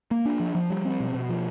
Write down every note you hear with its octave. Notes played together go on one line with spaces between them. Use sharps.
A#3
D4
F3
F3
G3
C4
B2
B2
F3